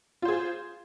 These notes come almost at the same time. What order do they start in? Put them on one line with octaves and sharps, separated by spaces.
F4 C5 G#4